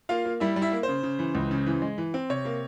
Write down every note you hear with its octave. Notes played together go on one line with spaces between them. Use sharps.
A#3 F4 F5
A#3
G3 E4 E5
G3
E4 E5
A#3
C5
C#3
C#3
E3
C#2
C#3
E3
G#3
E3
C4
C3 C#5
A#3